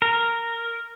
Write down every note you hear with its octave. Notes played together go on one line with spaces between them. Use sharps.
A#4